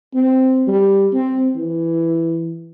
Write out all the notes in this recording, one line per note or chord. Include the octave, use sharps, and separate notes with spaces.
C4
G3
C4
E3